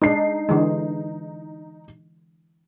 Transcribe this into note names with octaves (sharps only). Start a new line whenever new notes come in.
G#3 D4 D#4 C7
D3 E3 G#3